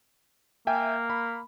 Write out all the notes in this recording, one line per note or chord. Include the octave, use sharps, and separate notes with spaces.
A#3 E5 G5 G#5
B5